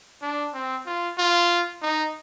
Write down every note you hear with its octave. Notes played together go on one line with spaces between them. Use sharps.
D4
C4
F4
F4
D#4